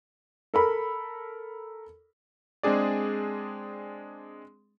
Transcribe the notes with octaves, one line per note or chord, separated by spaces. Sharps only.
A4 A#4 B5
G#3 C4 D4 G#4 D5